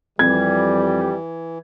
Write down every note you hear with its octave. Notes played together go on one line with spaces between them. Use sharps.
F2 E3 G3 G#6